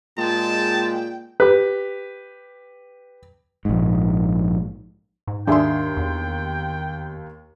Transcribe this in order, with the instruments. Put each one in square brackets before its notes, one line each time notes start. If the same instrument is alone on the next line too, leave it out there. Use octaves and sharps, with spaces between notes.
[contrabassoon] A#2 [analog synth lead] G#3 [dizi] G5 [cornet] A5
[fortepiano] G4 B4
[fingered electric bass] A#1 G#2
[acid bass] G#2
[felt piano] D#2 C6 [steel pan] D4 G#4 E5 [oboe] G5
[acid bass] E2